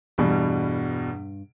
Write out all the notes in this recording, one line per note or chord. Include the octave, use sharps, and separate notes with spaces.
E2 G2 B2 G3